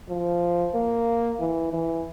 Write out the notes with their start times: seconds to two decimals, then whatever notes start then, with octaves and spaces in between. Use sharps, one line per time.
0.09 F3
0.75 A#3
1.40 E3
1.73 E3